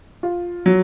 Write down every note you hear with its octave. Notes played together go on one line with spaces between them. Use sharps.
F4
F#3